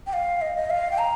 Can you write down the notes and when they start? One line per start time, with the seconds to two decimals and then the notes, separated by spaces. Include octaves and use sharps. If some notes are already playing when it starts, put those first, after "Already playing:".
0.07 G5
0.13 F5
0.41 D#5
0.56 D#5
0.70 F5
0.91 G5
0.98 A#5